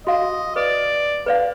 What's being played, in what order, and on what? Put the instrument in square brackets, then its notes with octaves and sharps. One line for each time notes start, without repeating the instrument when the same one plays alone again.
[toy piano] F#4 F5 [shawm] D#5
[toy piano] B4 [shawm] D5
[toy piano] B4 D5 F5